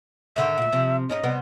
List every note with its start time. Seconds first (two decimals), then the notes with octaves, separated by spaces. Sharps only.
0.36 G#2 D3 D#3 E5
0.58 D2 A#2
0.72 C3 F3
1.09 G#2 C#4 D#4 D#5
1.23 C3 G3 B3